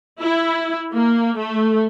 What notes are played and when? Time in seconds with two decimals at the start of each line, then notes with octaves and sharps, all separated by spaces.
0.21 E4
0.92 A#3
1.37 A3